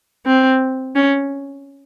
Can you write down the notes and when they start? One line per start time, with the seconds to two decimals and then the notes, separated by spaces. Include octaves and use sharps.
0.26 C4
0.96 C#4